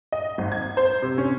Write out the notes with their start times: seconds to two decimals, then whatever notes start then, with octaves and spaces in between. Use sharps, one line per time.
0.12 D#5
0.38 G#1
0.52 G#6
0.77 C5
1.02 C3
1.18 C#4